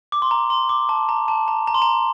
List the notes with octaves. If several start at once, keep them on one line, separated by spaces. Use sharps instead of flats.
D6
C6
A#5
C6
D6
A5
A#5
A5
A#5
A#5
C6
A#5